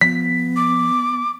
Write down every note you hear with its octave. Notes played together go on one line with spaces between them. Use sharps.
F3 B3 B6
D6